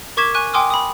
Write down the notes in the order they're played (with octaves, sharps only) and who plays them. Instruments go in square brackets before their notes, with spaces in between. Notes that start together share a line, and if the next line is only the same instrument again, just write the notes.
[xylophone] A#4 C#6 D6 G#6 B6 E7
G#5 C#6 F#6 D#7
G5 G#5 C6 D6 D#6 F6
B5 D#6